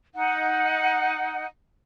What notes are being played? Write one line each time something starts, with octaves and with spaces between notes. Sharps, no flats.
D#4 F#5